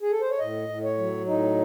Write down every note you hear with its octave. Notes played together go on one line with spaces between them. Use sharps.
G#4
A4
C5
C#5
A2 D#5
A2
C#5
F#3
A2 D#4